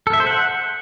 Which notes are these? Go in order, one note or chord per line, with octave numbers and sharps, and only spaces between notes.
A4
E5
C5
F#5